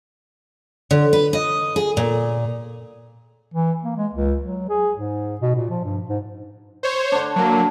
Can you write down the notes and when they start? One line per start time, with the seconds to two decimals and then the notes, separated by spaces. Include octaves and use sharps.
0.91 D3
1.13 B4
1.33 D#5
1.76 G#4
1.97 A#2
3.54 E3
3.84 A#3
3.97 G#3
4.13 C#2
4.41 F#3
4.69 G#4
4.97 G#2
5.41 B2
5.55 A#2
5.70 F3
5.84 G2
6.09 G#2
6.83 C5 C#5
7.12 D3 D4
7.36 F#3 A#3